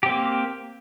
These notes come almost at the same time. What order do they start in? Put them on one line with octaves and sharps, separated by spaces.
G4 C4 A#3